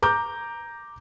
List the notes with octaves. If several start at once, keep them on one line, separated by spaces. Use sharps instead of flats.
A#5 D6 G6